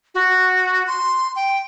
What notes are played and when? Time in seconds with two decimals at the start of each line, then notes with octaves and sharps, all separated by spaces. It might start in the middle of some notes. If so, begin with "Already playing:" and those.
0.15 F#4
0.87 C6
1.36 G5